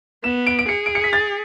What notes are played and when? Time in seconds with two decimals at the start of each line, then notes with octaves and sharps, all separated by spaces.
0.24 B3 E7
0.47 D7
0.59 D7
0.68 G#4 C#7
0.86 D7
0.95 C#7
1.04 B6
1.13 A6